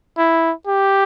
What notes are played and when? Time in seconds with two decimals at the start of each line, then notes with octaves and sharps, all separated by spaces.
0.17 E4
0.67 G4